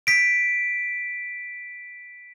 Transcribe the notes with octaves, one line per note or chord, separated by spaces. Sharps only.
B6 D7